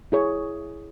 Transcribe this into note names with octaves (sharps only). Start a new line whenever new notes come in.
E4 G#4 C#5